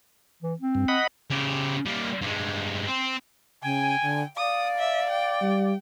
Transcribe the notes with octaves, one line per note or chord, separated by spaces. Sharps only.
E3
C4
G2
D#5 F#5 B5
C#3 G4
G3 A#3
G2 G#3
C4
C#3 G5 G#5
D3
D5 F5 D#6
E5
G5
G3